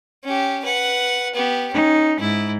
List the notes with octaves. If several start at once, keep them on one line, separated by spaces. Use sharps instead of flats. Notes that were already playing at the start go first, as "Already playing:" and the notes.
C#4 G4
B4 F#5
B3 G4
C#4 D#4
G#2 E4